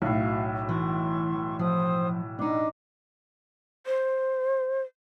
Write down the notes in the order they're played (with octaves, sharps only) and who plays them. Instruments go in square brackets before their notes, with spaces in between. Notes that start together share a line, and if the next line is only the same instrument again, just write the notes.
[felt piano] B1 A2 [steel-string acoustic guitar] F#4 [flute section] E5 F5
[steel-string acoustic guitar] E3 [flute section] C6 C#6
[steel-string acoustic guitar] F3 [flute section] C5 D#6
[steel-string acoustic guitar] D4 D#4 [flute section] D5 D#5 D6
[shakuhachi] C5